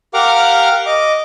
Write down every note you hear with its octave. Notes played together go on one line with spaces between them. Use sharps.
G4 A#4 F5 F#5 D6 F6
D#5 D6